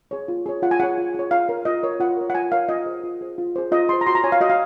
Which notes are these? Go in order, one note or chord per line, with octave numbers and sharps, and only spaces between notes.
G#4 C#5
F4
G#4 C#5
F4 F#5
G#5
G#4 C#5 F#5
F4
G#4 C#5
F4 F5
A#4 C#5
F4 D#5
A#4 C#5
F4 F#5
A#4 C#5
F#5
F4 G#5
A#4 C#5 F5
F4 D#5
G#4 C5
F4
G#4 C5
F4
G#4 C5
F4 D#5
G#4 C5 C6
A#5
F#4 C6
A#5
C#5 G#5
F5
F#4 D#5
F5